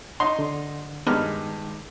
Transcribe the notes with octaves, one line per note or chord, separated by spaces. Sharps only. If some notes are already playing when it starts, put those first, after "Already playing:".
D#4 C6
D3
G2 D#3 G#3 B3 D#4 F6